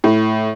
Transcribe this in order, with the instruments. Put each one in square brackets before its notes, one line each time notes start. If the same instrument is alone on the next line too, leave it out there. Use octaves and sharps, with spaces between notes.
[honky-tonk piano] A2